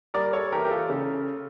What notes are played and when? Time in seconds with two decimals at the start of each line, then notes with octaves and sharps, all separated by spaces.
0.14 G3 A#4 D5
0.33 A4 C#5
0.52 E3 G4 A#4
0.64 G4
0.71 F4 A4
0.90 C#3